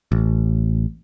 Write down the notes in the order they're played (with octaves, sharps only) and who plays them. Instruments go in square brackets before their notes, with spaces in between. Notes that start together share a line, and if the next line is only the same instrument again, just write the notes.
[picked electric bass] A1